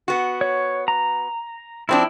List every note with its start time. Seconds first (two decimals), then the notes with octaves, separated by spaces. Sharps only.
0.08 B3 F#4
0.41 C#5
0.88 A#5
1.89 F3 C4 D4 E4